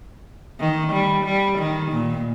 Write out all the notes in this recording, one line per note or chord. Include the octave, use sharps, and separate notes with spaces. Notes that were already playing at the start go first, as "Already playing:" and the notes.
D#3
G3
G3
D#3
A#2